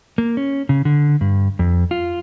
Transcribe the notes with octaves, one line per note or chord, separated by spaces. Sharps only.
A#3
C#4
C#3
D3
G2
F2
F4